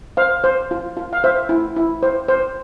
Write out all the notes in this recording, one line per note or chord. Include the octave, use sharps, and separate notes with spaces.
C5 F5
C5
F4
F4
F5
C5 E5
E4
E4
C5
C5